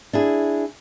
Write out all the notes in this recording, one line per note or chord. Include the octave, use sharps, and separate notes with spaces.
D4 E4 G#4